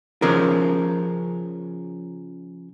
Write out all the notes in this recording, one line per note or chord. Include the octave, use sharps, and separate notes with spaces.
C#3 F3 A#4